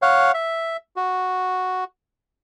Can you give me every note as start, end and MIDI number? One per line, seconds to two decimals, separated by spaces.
0.02 0.32 73
0.02 0.32 77
0.02 0.32 78
0.34 0.77 76
0.96 1.84 66